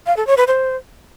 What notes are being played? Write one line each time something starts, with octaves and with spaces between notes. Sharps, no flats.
F5
A4
C#5
B4
C5